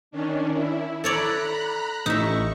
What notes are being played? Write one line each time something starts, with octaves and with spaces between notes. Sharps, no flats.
D#3 C#4 D4
E4
A4 C#5 D5 A#5 B5 F#6
A1 D#4 E5 C#6